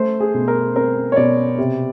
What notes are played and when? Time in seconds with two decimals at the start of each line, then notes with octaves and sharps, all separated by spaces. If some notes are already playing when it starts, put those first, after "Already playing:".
Already playing: A3 C5
0.20 G#4
0.34 B2
0.48 A#4
0.76 C4 A#4
1.12 C#5
1.16 B2 D5
1.58 C3